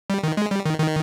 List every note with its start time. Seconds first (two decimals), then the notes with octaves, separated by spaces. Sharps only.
0.10 G3
0.23 D#3
0.37 G#3
0.51 G3
0.66 D#3
0.79 D#3